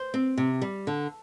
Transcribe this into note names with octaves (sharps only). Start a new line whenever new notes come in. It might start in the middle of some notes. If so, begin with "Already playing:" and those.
Already playing: C5
C4
C3
G3
D3